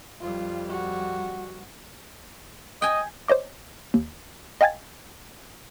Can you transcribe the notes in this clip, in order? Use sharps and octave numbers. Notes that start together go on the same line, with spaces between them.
F2 G3 F4
F#4
D#5 G5 G#5
C5 C#5 D#5 D6
D#2
D#5 F5 G5 G#5 G#6 A6